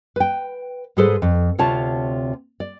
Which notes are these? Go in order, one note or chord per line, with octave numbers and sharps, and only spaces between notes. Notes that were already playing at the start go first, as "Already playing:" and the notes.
B4 G5
G#2 G3 G#4 A4 B4 C5
F2
D2 C3 F4 C#5 A5
D5